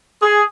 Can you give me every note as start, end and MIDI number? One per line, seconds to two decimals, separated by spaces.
0.22 0.43 68